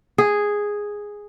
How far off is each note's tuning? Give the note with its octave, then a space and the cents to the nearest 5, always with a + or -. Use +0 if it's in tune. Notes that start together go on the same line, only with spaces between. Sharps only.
G#4 -5